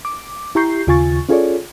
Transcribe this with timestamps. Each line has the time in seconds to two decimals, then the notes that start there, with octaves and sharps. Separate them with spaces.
0.05 D6
0.55 E4 G4 A#5 C#6 G6 C7
0.87 D#2 C#3 F4 G#5 C#6 A6
1.29 C#4 F4 G#4 A4 C#5 D5